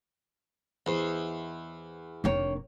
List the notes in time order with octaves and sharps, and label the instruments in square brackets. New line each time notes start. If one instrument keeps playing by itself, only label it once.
[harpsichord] E2 [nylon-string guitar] C5 D#5
[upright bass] F1 D4 [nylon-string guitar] D#3 A#3 C#5